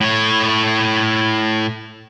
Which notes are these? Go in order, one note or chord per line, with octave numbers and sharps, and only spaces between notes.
A2 C#5